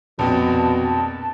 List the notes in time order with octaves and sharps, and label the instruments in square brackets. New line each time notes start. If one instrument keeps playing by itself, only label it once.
[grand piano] A#1 F2 [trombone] B2 [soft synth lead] A5